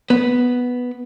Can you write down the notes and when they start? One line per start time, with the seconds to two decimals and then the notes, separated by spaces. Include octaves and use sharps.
0.10 B3